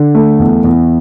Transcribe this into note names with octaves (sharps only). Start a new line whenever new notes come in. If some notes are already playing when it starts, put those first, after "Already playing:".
Already playing: D3
A3
E2
E2